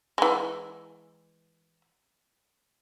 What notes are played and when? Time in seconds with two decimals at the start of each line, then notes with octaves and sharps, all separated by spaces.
0.18 E3 G#3